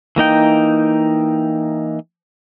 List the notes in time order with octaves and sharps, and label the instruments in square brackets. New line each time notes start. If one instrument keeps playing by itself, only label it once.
[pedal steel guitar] E3 A#3 D#4 G5